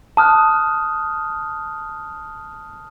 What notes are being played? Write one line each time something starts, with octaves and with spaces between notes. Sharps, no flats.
A5 D#6 F6 F#6